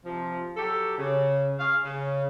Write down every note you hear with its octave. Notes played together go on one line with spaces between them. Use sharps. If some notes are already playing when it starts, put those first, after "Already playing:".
C3 F3
F#3 G4 A4
C#3
C#4 G#4 F5
C#3